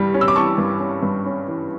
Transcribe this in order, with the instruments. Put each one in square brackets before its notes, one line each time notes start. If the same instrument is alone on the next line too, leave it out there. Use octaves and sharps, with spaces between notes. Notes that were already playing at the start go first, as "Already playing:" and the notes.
Already playing: [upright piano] G2 E3 G3
C#4
E6
D6
E3 A5 C#6
G2
C#4
G2
C#4
E3